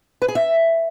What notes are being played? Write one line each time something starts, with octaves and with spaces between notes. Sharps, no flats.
B4
G#4
E5